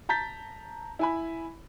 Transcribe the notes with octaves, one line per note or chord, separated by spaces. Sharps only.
A5 A#5 G6 A6 B6
E4 G#5 B5